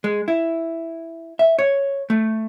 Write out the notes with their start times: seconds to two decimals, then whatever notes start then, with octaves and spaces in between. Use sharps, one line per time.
0.04 G#3
0.28 E4
1.39 E5
1.59 C#5
2.10 A3